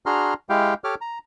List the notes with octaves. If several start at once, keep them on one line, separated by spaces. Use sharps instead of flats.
D4 F#4 G#4 A#5 C6 F6
G#3 E4 G4 F5 G5
G4 A4 C#5 D6 F6
A#5